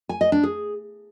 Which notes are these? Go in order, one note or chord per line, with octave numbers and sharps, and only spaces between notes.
G#5
D#5
D4
G#4